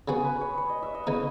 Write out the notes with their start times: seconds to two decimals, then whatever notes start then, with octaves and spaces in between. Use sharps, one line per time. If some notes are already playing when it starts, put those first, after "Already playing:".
0.08 C#3 F#3 B3 F#4 G#4
0.24 B4
0.41 C#5
0.58 C#5
0.69 D#5
0.83 E5
0.94 D#5
1.07 C#3 E3 B3 D#4 D#5